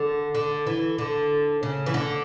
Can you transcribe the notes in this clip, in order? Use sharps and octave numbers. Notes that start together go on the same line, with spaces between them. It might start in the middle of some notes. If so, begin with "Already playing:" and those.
Already playing: D3
D3
E3
D3
C#3
E3
D3